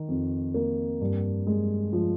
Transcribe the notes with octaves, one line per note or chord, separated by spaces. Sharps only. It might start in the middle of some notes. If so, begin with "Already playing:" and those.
Already playing: D#3 D#4
F2
A#3
G2
G#3
F3